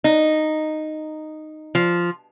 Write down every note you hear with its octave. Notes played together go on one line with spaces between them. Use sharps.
D#4
F3